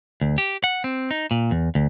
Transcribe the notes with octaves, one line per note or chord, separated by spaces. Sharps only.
D2
G4
F#5
C4
D#4
A#2
E2
D2